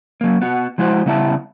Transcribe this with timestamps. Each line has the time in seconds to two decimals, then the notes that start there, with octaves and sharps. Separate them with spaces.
0.21 F#3 A#3
0.41 B3 F#4
0.78 F3 G#3 E4 F#4 C5
1.06 C#3 G3 B3 E4 E5 A5